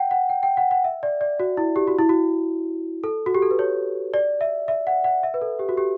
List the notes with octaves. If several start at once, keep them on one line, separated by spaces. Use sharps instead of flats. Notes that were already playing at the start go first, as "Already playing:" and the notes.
Already playing: F#5 G5
F#5
G5
G5
F#5
F#5
E5
D5
D5
F#4
E4
G4
F#4
E4
F#4
A4
F#4
G4
A4
B4
C#5
D5
E5
E5
F#5
F#5
E5
B4
A4
G4
F#4
G4